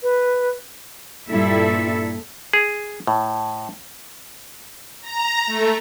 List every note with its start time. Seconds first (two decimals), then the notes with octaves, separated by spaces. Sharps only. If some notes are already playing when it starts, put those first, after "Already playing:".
0.03 B4
1.28 G2 A#2 G3 E4 A4 E5
2.53 G#4
3.07 A2
5.01 A#5
5.46 A3